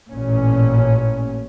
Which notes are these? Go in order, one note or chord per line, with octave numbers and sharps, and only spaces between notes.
A1 A#2 C#4